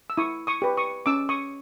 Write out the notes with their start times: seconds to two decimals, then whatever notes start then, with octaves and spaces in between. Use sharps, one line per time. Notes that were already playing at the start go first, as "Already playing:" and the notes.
0.10 E6
0.17 E4 C#6 D#6
0.47 C#6 D#6
0.62 G4 B4
0.77 C#6 D#6
1.06 C#4 D6 E6
1.29 C#6 D#6